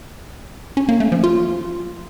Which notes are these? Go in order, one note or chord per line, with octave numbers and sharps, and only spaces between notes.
C#4
A#3
A3
F3
F4